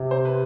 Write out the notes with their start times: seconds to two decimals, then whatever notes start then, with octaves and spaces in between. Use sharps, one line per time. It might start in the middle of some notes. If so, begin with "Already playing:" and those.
Already playing: C3
0.11 C5
0.25 B4